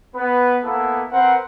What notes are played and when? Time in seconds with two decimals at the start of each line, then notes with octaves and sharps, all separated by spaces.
0.15 B3 B4
0.64 A#3 B3 E4 A4
1.12 C4 A#4 B4 F#5